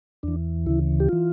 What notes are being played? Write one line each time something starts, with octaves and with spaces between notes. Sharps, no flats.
E2 E3 D4
D2 C#3 E3 E4
G4
E3 F4